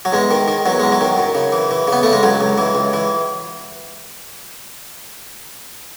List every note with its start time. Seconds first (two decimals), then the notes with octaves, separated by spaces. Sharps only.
0.05 F#3
0.12 E2 G#3
0.31 D#3
0.48 D#3
0.66 E2 F#3
0.80 E2 G#3
0.92 F#3
1.01 D#3
1.18 F#2
1.35 C#3
1.52 E3
1.71 E3
1.88 C#3
1.93 B3
2.03 C#3 A3
2.13 G#3
2.23 C#2 F#3
2.41 C#2
2.58 E3
2.75 C#2
2.93 E3